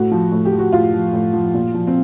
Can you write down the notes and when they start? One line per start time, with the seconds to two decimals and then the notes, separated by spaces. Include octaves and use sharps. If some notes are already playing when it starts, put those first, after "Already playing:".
Already playing: A2 F#4
0.11 F3
0.32 A2
0.45 G4
0.52 F3
0.59 F#4
0.72 A2 F4
0.94 F3
1.13 A2
1.33 F3
1.54 A#2
1.74 F3
1.87 C4